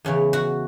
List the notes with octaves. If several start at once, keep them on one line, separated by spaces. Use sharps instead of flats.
E2 C#3 E3 C#4
F#4